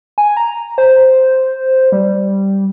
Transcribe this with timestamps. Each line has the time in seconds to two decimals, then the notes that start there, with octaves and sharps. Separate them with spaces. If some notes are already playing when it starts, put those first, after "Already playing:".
0.18 G#5
0.37 A#5
0.78 C5
1.92 G3